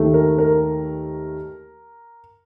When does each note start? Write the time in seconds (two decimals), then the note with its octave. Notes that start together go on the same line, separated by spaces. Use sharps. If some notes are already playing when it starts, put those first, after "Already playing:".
Already playing: D#2 D#3 A3
0.14 A#4
0.38 A#4